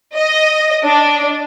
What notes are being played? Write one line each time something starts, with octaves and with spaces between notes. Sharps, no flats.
D#5
D4